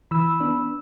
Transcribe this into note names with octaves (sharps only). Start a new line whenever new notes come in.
E3 B5 E6
B3 D4